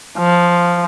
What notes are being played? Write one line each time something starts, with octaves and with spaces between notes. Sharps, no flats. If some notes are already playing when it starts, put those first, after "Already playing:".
F3